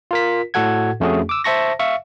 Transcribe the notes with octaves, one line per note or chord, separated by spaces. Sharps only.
F4 A#4 B6
A2 F#4 A4 F#5 G#6
F2 A3 C#4 F#4 G#4
D6 E6
C5 E5 A5 C#6 A#6
E5 F5 C#6